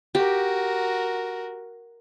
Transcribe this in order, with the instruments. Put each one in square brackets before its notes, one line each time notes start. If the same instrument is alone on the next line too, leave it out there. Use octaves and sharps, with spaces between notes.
[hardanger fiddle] F#4 A#4 [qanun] G4